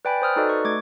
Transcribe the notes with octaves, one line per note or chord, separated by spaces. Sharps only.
B4 D5 G5 G#5 B5
C5 D#6 F6 F#6
D#4 F#4 A4 B4 D5 D#5
C#6
A3 D6 G#6